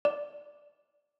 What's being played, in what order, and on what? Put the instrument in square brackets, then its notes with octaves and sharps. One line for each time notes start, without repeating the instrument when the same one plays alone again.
[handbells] D5